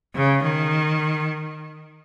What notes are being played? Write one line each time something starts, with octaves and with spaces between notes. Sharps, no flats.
C#3
D#3